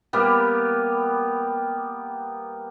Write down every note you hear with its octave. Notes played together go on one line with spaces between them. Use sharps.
G3 A#3 B3 G4